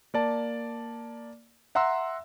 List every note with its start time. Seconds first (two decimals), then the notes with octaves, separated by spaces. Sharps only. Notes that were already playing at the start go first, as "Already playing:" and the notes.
0.14 A#3 D5 A5
1.75 E5 F#5 A#5 C6 E6